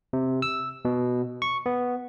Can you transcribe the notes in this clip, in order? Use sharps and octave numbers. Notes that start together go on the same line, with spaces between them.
C3
E6
B2
C#6
B3